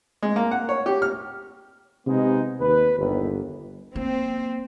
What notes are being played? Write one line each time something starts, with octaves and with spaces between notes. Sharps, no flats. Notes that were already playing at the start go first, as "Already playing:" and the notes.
G#3
A#3
F#5
C#5
G4
F6
C3 G#3 B3 D#4
D#2 B4
G1 D#2
A#3 C4